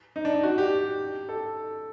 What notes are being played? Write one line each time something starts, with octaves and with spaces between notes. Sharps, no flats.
D#4
D4
D#4
F#4
G4
A4